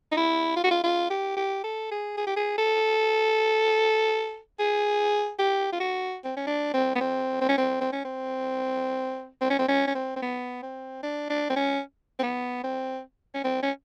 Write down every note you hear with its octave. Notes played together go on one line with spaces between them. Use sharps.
D#4
E4
F4
F#4
F4
F4
G4
G4
A4
G#4
G#4
G4
G#4
A4
G#4
G4
F4
F#4
C4
C#4
D4
C4
B3
C4
C4
C#4
C4
C4
C#4
C4
C4
C#4
C4
C#4
C#4
C4
C4
B3
C4
D4
D4
C4
C#4
C4
B3
C4
C#4
C4
C#4